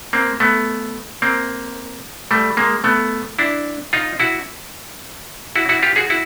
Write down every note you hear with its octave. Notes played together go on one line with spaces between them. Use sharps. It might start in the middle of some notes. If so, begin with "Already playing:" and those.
A#3 C4
A3 B3
A#3 C4
G3 A3
G#3 A#3
A3 B3
D4 E4
D#4 F4
E4 F#4
E4 F#4
E4 F#4
F4 G4
F#4 G#4
E4 F#4